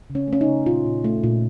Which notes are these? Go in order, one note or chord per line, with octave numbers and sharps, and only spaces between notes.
C#3
C#4
A3 C#4
D#4
C#3
A#2 F4
A#2
A3
A#2